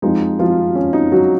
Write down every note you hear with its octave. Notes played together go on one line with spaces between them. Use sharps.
F2 F3 G#3 D#4
F3 F4
C#4
D#4
F#3 F#4